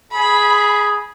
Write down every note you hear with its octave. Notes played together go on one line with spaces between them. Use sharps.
G#4 B5